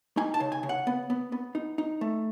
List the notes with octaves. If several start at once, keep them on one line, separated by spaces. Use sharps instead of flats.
D#4 G#5
A5
C#3
G#5
C#3
F#5
B3
B3
B3
D#4
D#4
A3